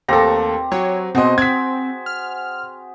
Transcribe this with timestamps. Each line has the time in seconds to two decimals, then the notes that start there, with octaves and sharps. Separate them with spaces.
0.08 D#2 A3 C4 G4 A4 A#5
0.72 F#3 C#5
1.15 B2 C4 F#4 G#4 C5 D#5
1.38 C4 G#6 B6
2.06 F6